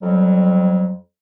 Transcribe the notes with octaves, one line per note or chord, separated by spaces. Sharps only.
F2 F#3 G3